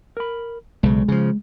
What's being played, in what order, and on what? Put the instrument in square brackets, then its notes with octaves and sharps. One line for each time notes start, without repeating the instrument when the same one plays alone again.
[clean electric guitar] A#4 B5
[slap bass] B1 C#3 [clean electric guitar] G#3
[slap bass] C#3 F3